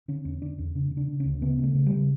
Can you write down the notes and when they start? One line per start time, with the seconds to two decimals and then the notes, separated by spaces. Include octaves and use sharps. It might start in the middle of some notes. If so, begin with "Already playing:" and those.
0.08 D3 C#4
0.25 E2 C#4
0.42 D3 D4
0.58 E2 C#4
0.75 C#3 D4
0.91 C#3
0.97 D4
1.08 C#3
1.20 C#4
1.25 D2
1.42 C#3 B3
1.59 C#3 A3
1.75 C#3
1.86 G3
1.92 C#3